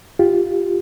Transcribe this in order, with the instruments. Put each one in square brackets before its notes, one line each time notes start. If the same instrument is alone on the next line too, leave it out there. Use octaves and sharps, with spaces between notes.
[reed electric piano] F4 G4